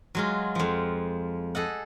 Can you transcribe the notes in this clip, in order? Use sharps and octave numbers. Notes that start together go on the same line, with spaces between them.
F#3 G#3 F4
F2 F3
G#4 A4 D#5 F#5